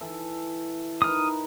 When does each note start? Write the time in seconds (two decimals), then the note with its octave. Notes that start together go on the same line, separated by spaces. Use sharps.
0.01 E3 A4
1.02 D#4 A#4 B4 D#6 F6